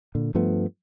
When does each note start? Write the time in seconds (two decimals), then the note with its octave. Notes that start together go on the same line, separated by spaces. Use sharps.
0.15 A#2 D3
0.35 G2 F3 A3 B3